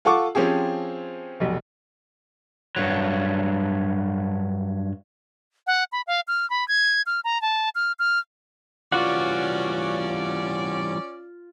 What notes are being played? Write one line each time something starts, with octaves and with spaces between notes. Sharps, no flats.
F4 A4 F#5 C#6 D6
F3 C4 C#4 G4 G#4
F1 B1
G2 F#3
F#5
B5
F5
F6
B5
G#6
F6
A#5
A5
F6
F6
E3 G3 C#4 F4 F#4 D5 F#5